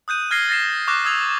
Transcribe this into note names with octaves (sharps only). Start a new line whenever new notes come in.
D#6 F#6 G6 D#7
F6 G#6 A#6 C7 G7
A6 A#6 C7 E7
C#6 D6 F6 F#6 A#6
D#6 E6 G#6 F7